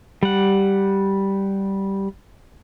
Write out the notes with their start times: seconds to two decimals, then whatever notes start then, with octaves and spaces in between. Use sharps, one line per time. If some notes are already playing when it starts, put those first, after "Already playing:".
0.23 G3 F#5